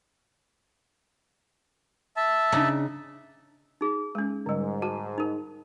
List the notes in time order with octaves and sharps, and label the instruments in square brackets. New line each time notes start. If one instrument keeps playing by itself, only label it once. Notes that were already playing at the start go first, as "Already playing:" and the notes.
[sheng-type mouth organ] E5 A5
[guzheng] C#3 D4 D#4
[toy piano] D#4 G#4
[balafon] G#3 C#4
[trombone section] G#2 [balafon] D3 G3
[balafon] F#4 [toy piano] A5
[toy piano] D#4 A#4